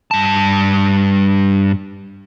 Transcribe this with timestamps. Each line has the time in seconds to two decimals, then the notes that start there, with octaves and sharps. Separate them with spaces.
0.11 G2 A5